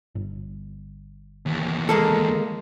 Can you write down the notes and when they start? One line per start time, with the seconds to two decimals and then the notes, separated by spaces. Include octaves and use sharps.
0.15 G1
1.46 D#2 E3
1.89 G#3 A#3 A4